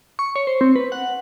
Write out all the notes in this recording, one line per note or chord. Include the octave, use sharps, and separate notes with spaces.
C#6
C#5
C5
C4
B4
F#5